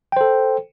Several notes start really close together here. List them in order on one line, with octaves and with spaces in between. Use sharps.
G5 C5 A4